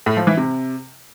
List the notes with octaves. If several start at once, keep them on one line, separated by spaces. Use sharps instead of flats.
A2
F3
E3
C3